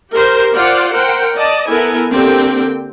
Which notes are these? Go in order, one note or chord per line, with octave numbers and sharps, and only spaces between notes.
G4 A#4 C5
F4 C5 D5 F#5
A#4 C5 F#5 G5
D5 D#5 A5
B3 E4 A4 A#4 G#5
D3 A#3 C4 G4 G5